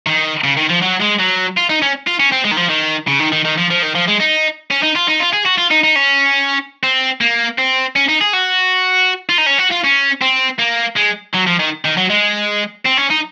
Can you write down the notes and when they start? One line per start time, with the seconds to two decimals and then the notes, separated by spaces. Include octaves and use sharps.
0.07 D#3
0.44 C#3
0.57 D#3
0.69 F3
0.82 F#3
1.00 G#3
1.19 F#3
1.57 F4
1.70 D#4
1.82 C#4
2.07 F4
2.20 C#4
2.32 C4
2.45 G#3
2.52 D#3
2.57 F3
2.69 D#3
3.07 C#3
3.20 D#3
3.32 D#3
3.45 D#3
3.58 F3
3.70 F3
3.82 D#3
3.95 F3
4.08 G#3
4.20 D#4
4.71 C#4
4.82 D#4
4.95 F4
5.08 D#4
5.19 F4
5.33 G#4
5.45 F#4
5.58 F4
5.71 D#4
5.83 D#4
5.96 C#4
6.83 C4
7.21 A#3
7.59 C4
7.96 C#4
8.09 D#4
8.21 G#4
8.33 F#4
9.29 F4
9.38 D#4
9.47 C#4
9.59 F#4
9.71 F4
9.84 C#4
10.22 C4
10.59 A#3
10.97 G#3
11.34 F#3
11.47 F3
11.60 D#3
11.85 D#3
11.97 F#3
12.10 G#3
12.85 C4
12.97 C#4
13.10 D#4